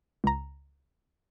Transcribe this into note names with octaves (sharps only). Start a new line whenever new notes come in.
C#2 A#5